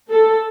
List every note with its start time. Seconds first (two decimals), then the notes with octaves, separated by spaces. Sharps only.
0.12 A4